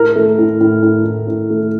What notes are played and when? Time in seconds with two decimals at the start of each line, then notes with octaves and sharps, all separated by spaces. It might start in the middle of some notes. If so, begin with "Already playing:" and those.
Already playing: A2 A#4
0.16 A3
0.38 A2
0.61 A2
0.83 A2
1.05 A2
1.28 A2
1.50 A3